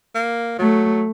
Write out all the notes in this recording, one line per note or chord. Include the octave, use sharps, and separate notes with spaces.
A#3
F#3 A3